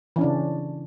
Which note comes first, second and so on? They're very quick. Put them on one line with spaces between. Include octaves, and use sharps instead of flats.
E3 C#4 D4 C#3